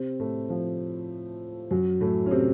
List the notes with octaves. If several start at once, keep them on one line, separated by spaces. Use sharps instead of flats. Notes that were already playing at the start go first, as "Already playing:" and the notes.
Already playing: C3 C4
A2 A3
F3
F#2 F#3
A2 A3
C#4
C3 C4